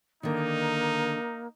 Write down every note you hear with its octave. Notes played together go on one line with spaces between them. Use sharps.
D3 D#3 A#3 D#4